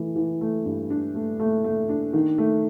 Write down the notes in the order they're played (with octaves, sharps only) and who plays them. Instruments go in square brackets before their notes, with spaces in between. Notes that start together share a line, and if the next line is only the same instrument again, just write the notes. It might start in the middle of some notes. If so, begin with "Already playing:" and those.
Already playing: [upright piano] E3 A3
E3
A3
G2
D4
A3
A3
A3
D4
D#3
A3